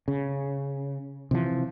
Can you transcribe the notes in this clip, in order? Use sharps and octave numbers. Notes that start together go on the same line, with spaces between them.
C#3
C3 E3 F3